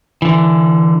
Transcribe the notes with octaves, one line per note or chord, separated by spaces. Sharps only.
D3 E3